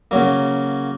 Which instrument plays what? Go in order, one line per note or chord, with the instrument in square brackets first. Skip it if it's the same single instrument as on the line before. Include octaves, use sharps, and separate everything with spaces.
[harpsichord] C#3 F#3 A#3